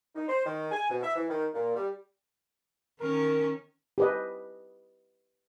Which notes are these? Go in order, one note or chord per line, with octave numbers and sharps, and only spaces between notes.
D#4
C5
D#3
G#5
B2
E5
E3
D#3
A#2
G3
D#3 C#4 A#4
G4 B4 D#5